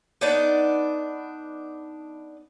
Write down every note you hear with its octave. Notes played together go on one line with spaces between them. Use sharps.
B3 D4 D#4 D5